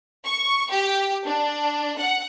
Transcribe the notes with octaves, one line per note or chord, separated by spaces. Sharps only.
C#6
G4
D4
F#5